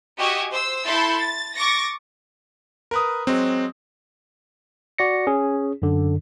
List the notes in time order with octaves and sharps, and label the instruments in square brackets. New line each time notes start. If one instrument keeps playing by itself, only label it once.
[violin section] F#4 G4 D#5 E5 G#5
C5 E6
E4 A4 B5 C6 G6 A6
A6
C#6 D6 A6 A#6
[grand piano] A#4 B4 D#6
[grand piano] F#3 G#3 [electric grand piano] C4
[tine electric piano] F#4 D5 A#6 C#7
C#4 G#4
F#2 D3